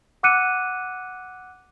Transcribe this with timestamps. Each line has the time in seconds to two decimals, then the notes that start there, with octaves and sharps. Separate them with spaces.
0.23 F#5 D6 E6 F#6 C#7 D#7